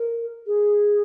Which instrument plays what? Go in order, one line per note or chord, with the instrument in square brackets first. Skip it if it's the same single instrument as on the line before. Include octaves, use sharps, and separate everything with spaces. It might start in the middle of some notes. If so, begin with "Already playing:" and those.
Already playing: [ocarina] A#4
G#4